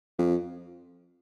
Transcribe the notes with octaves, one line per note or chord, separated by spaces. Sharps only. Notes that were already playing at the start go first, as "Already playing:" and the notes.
F2